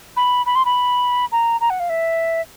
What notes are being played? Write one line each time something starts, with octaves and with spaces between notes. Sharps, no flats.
B5
B5
C6
B5
A#5
A#5
F#5
F5
E5